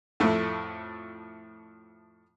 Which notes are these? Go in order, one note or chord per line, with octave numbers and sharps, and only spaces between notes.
F2 A2 A3 E5